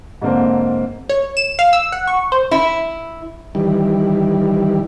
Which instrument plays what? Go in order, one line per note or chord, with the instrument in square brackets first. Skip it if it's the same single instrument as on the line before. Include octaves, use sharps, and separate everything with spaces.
[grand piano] G#2 D3 A#3 C4
[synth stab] C#5
E7
F5
E6
F#5
C#6
C5
[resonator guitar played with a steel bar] E4
[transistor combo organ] D#3 E3 G3